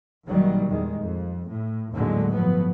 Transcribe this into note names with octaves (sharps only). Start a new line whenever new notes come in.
A#1 A#2 D#3 F#3 G3
E2 D#3 G#3
F2
A2
D#2 A2 D3 F#3 G#3
G1 F3 F#3 B3